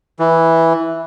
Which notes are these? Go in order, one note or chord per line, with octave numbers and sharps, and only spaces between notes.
E3